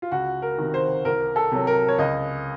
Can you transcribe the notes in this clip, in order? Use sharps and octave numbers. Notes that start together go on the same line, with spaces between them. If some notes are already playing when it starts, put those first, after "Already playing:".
F4
C#2 F#4
A#4
C3 D#3
C5
C2 A#4
A4
C3 F#3
A#4
C#5
C#2 D#5